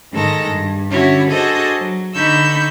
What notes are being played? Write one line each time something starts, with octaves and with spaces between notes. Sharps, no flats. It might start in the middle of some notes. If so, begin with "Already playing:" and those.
G#2 D#3 G#3 A4 A#6
G2
D3 C#4 E4 F#4 C#5
D4 F#4 G#4 A4 C5 D#5
F#3
D3 D#4 B5 C#6 E6 G6